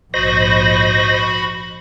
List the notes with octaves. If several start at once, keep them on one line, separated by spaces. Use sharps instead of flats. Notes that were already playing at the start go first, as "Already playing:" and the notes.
A#1 G#2 F#4 C5 D#5 B5 A#6